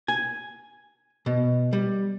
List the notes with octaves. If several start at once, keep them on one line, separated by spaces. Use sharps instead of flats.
G#5
B2
G3